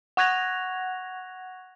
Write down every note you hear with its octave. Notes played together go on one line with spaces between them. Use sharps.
F#5 C#6 F#6 G#6 A#6 F7